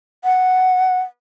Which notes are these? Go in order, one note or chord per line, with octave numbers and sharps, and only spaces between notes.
F#5